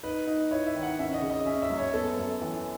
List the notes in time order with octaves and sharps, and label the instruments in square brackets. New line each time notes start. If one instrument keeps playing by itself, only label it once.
[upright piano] D#4 [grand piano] B4
[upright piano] D#4
[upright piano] E4 [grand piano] C#5
[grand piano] E5
[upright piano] D#3
[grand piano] F#5
[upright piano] C#4 [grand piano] E5
[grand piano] D#5
[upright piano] C#3
[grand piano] D#5
[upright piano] C#4 [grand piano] E5
[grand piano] E5
[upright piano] F#2
[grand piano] C#5
[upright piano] B3 [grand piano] A4
[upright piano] F#2
E3